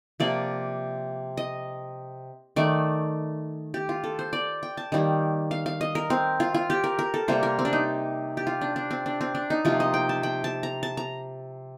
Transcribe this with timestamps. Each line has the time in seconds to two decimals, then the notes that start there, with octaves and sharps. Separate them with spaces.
0.20 C3 F3 A#3 D5
1.37 D#5
2.56 D#3 A3 D5
3.74 G4
3.89 F4
4.04 A4
4.19 C5
4.33 D5
4.63 G5
4.77 A5
4.92 D#3 G3 A#3
5.51 F5
5.66 F5
5.81 D#5
5.95 A#4
6.10 C4
6.40 F4
6.54 F4
6.70 G4
6.84 A#4
6.99 A#4
7.14 A4
7.28 C3 G3 A#3 C5
7.43 A#4
7.59 C4
7.65 D4
7.73 D#4
8.37 G4
8.47 F4
8.61 D4
8.76 D4
8.91 C4
9.06 D4
9.21 C4
9.35 D4
9.50 D#4
9.65 C3 F3 A#3 F4
9.80 D#5
9.94 G5
10.09 A5
10.23 G5
10.44 A5
10.63 A#5
10.83 A5
10.97 A#5